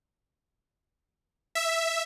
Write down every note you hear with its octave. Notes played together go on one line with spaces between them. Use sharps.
E5